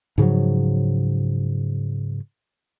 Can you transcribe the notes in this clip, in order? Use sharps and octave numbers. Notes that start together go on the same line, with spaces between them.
G#2 C#3 F3 F#3